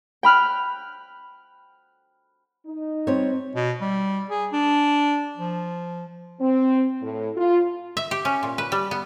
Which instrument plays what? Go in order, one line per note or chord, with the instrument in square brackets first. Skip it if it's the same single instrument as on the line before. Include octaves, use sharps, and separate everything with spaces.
[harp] G5 B5 F6 F#6
[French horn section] D#4
[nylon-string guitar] G3 C#5 [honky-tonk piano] C4
[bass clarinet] B2
G3
G#4
D4
F3
[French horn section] C4
A2
F4
[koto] E5
G4
C#4
A#2
B4
G3
B3